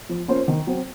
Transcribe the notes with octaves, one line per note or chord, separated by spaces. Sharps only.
F3
A#3 C#4 F4 C5
D#3
F#3 C4